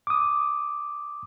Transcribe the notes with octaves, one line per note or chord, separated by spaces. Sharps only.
D6 D#6